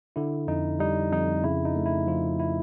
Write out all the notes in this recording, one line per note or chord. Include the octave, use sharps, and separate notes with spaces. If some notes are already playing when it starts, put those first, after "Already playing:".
D3 E4
F2 D#4
G3 D#4
F2 D#4
C#3 E4
D#4
A3
E4
F3 F4
E4